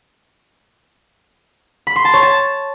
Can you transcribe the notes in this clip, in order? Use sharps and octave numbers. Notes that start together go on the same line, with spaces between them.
B5
C6
A5
C#5
A5